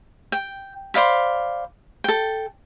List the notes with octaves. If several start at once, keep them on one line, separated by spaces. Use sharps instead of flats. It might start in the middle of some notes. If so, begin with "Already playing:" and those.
G5
C5 D5 F5 B5
A4 G5